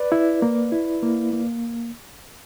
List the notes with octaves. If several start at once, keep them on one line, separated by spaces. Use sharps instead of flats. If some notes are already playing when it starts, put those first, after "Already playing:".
Already playing: B4 D5
E4
A#3
E4
A#3
A#3